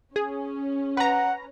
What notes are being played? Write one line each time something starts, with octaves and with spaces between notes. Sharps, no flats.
C#4 G#4
B4 F#5 A#5